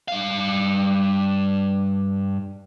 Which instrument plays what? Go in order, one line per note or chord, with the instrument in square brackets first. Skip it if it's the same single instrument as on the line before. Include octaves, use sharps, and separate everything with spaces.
[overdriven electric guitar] G2 F5